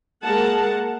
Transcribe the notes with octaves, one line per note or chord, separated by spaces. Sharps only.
G#3 A#3 A#4 F#5 A5